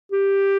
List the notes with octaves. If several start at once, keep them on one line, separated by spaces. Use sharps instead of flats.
G4